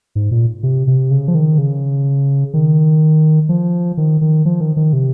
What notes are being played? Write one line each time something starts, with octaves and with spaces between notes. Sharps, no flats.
G#2
A#2
C3
C3
C#3
F3
D#3
C#3
D#3
F3
D#3
D#3
F3
D#3
D#3
C3